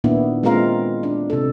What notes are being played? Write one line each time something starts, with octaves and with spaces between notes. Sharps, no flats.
A#2 D#3 A#3 B3 D4 E4
G#3 A#3 C4 F4 A#4 F5
D4
C3 A4